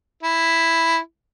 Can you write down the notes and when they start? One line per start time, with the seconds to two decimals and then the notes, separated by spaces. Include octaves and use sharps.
0.23 E4